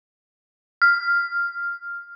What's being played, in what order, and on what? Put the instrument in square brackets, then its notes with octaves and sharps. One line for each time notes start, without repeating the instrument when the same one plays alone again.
[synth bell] F6